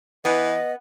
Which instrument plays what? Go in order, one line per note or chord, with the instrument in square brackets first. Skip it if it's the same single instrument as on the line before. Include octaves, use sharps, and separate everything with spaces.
[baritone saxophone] E3 [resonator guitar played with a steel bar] B3 [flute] D#5